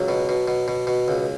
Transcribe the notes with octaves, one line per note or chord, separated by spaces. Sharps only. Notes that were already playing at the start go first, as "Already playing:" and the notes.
Already playing: C#2 F#3
B2
B2
B2
B2
B2
C#2